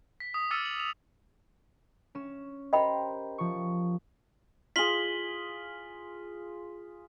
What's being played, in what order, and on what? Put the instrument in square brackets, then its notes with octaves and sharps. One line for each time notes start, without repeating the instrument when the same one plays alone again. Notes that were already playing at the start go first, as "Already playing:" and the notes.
[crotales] B6
D#6
D6 E6 F6 A6 C#7 D#7
F#7
F7
[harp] C#4 E7
[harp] G4 A#4 C5 [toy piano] D#5 G5 B5
[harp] F3 C#6
[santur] F4 G#4 [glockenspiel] B6 F#7 G7